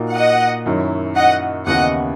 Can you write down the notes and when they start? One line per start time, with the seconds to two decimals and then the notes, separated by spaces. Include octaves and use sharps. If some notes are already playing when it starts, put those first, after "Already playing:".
Already playing: A#2 A#3 D#4 F#4
0.14 D#5 F#5
0.66 F#2 D#3 F#3 C#4 E4
1.16 D#5 F#5
1.66 D#2 C#3 E3 B3 E4 D#5 F#5